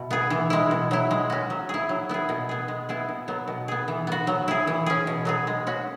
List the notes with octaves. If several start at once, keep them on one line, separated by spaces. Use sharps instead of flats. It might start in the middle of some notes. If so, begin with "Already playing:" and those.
Already playing: B2 E4
B3 G#4
E3
G#3 E4
B2
F#3 E4
G#3
C#4 F#4
F#3
E4 G#4
F#3
B3 E4 G#4
B2
B3 G#4
G#3
B3 E4 G#4
B2
F#3 B3
B2
B3 G#4
E3
B3 F#4
F#3
E4 G#4
E3
C#4 G#4
B2
F#3 B3 G#4
G#3
C#4 F#4